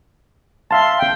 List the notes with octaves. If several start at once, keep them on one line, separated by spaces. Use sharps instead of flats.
E5 F5 A5 C6
G5